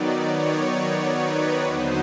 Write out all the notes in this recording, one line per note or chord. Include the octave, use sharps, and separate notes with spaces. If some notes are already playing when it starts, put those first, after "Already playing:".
Already playing: D#3 F#3 B3 D#4 D5
C#5
C#5
B4
D#2 D3 F#3 B3 D#4 C5